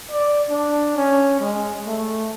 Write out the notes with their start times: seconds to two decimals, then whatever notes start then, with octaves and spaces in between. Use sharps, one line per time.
0.11 D5
0.50 D4
0.97 C#4
1.40 G#3
1.86 A3